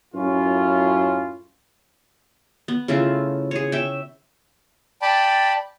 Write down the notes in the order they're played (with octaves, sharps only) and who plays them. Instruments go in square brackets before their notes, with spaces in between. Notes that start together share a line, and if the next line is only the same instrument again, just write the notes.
[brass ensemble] F#2 A2 C#4 E4 F4
[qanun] B3
C#3 A3 E4 F4
G#4 C#5
E5 G5
[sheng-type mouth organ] D5 G5 A5 B5